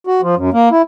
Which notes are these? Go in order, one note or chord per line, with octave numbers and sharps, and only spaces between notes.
F#4
F3
F#2
A#3
E4